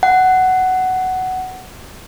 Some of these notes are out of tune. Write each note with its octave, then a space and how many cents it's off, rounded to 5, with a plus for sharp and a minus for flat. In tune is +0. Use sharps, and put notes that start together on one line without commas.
F#5 +10